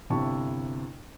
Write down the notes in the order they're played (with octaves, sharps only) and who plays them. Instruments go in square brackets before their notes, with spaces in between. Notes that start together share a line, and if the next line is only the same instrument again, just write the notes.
[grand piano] G1 C3 E4 A5 C#6